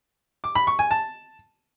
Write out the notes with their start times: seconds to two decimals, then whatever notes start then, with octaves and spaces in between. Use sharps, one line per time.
0.44 D6
0.55 B5
0.67 C#6
0.79 G#5
0.91 A5